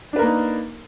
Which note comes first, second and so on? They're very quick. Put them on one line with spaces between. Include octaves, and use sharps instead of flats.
D4 B4 A#4 A#3 D#4